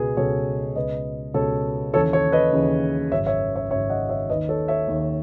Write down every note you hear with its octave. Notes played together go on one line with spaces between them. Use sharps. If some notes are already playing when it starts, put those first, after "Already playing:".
Already playing: C#2 B2 G#4 B4
C#2 B2 A4 C#5
C#2 B2 B4 D#5
C#2 B2 A4 C#5
D#2 C#3 E3 A4 C#5
A4 C#5
B4 D#5
D#2 C#3 E3
G#1 F#2 C#3 C#5 E5
C#5 E5
C#5 E5
G#1 F#2 C#3 C#5 E5
D#5 F#5
C#5 E5
D#2 D#3 B4 D#5
A4 C#5
C#5 E5
D#2 D#3